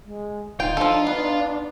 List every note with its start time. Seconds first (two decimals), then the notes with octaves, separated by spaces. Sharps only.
0.05 G#3
0.60 D1 D#4 F4 G5
0.77 F3 D4 A4
1.07 B3